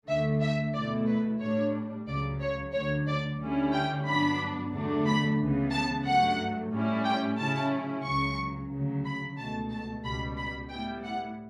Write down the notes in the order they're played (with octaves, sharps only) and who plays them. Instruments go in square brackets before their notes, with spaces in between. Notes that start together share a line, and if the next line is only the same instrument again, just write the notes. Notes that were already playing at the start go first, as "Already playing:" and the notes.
[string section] D2 D3 A3 E5
E5
E2 B2 A3 E4 D5
B4
A2 G3 D4 C#5
C#2 C#3 F#3 D5
C#5
D2 D3 F#3 C#5
D5
D2 D3 G3 C#4 E4
G5
G2 F#3 B3 D4 B5
E2 D3 F#3 A3 D4
B5
C#2 C#3 E3 B3
A5
G2 F#3 A3 F#5
A2 G3 C#4 E4
G5
C#3 F#3 C#4 E4 A5
C#2 C#3 F#3 C#6
D2 C#3 F#3
B5
C#2 B2 A3 A5
A5
C#2 B2 G3 B5
B5
A2 G3 B3 E4 G5
F#5